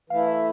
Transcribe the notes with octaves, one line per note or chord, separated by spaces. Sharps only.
E3 A3 E4 F5
E5